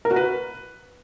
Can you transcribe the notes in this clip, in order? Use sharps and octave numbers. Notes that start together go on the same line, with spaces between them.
A#4
F#4
B4